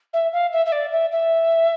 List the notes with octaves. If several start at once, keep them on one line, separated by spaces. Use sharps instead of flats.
E5
F5
E5
E5
D5
E5
E5